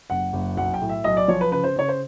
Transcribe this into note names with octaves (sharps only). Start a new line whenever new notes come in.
F#1 F#5
F#1
B1 F#5
G5
A2
E5
B1 D#5
D5
F3 C#5
B4
C#3 B4
C5
C#3 C#5
C5